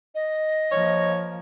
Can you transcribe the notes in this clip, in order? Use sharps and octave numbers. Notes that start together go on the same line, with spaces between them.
D#5
F3 A#3 C#5